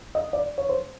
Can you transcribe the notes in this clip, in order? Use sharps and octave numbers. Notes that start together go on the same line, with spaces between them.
D#5
D5
C#5
C5